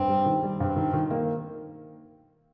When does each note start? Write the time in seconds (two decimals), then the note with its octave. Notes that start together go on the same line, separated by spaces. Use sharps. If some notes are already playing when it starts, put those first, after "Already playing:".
Already playing: G2 C4
0.08 G3
0.26 D#3
0.43 G3
0.60 G2 C4
0.76 D#3
0.93 D#3
1.11 A#3